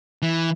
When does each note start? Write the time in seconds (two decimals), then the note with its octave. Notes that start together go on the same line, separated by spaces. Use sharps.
0.22 E3